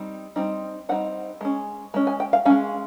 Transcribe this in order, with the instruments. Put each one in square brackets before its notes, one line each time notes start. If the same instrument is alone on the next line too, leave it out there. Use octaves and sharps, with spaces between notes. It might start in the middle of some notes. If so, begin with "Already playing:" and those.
Already playing: [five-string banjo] G3 C4 D#4
G3 C4 D#4
G3 C4 D#4 F#5
G#3 C#4
G#3 C#4
G#5
G5
F5
G#3 C#4 F5